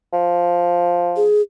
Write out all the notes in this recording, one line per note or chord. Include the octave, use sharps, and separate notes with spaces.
F3
G#4